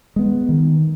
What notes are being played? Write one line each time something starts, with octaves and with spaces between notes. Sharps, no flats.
G#3 B3
D#3